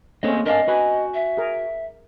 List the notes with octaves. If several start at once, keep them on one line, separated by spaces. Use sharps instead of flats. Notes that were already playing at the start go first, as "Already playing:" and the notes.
A3 A#3 C4 C#4 G#4 D#5
D4 A#4 D#5 F5 G#5
F#4 B4 G#5
E5
G#4 A#4